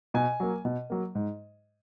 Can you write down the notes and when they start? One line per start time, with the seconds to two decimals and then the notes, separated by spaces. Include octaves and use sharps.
0.14 B2 G#5
0.40 F#3 A#3
0.65 B2
0.90 F#3 A#3
1.15 G#2